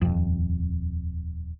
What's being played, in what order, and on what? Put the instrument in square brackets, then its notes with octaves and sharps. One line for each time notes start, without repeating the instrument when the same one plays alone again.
[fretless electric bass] D#1 F2